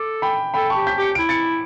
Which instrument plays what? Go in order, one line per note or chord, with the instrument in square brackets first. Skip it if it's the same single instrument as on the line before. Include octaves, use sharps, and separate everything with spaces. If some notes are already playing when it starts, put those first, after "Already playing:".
Already playing: [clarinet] A4 [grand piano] D6
[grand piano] G5 B5
[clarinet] A4 [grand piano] G5 B5
[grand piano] A5 C#6
[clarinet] G4
[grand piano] G6 B6
[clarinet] G4
[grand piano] C#7
[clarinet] E4 [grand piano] D7
[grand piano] A6 C#7